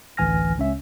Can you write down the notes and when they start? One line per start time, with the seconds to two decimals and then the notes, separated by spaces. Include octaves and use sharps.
0.17 A1 D2 E3 G#5 F6 A#6
0.58 C#2 C#4 E5